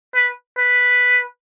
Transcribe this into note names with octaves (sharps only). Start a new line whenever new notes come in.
B4
B4